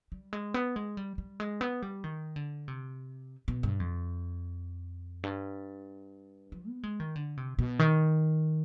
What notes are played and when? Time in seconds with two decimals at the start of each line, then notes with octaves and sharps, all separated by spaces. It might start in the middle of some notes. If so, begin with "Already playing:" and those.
0.12 G3
0.33 G#3
0.54 B3
0.76 G#3
0.97 G3
1.18 G3
1.40 G#3
1.61 B3
1.82 G3
2.04 D#3
2.36 D3
2.68 C3
3.48 B2
3.63 G2
3.80 F2
5.23 G2
6.52 F3
6.68 B3
6.83 G#3
7.00 D#3
7.16 D3
7.37 C3
7.59 B2
7.79 D#3